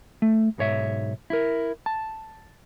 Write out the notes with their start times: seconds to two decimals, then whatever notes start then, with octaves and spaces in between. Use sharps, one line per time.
0.22 A3
0.58 B1 G#2 C#5 E5
1.30 E4 A#4
1.86 A5